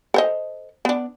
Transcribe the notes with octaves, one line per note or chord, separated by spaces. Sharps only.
A4 C5 D#5
B3 D4